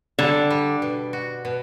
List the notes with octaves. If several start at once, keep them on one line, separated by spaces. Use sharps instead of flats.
D3 G3
G3
B2
F#4
B2